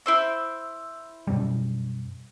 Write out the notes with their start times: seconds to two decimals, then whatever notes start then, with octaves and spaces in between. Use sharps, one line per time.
0.06 E4 C5 E6
1.27 F#2 B2 G3